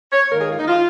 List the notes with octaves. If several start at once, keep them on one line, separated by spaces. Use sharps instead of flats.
C#5
G#2 D#3 A#3 A#4
G#4
F4
D#4
F4